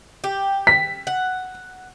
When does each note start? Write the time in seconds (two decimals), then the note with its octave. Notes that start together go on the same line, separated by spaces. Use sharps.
0.24 G4
0.67 B6
1.07 F#5